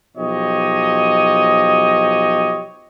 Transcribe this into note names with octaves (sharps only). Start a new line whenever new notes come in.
B1 F3 G4 C#5 D#5